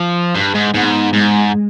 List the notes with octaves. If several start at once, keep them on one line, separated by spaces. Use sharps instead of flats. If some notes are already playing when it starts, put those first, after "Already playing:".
Already playing: F3
G2
G#2
G#2 B3
G#2 G#3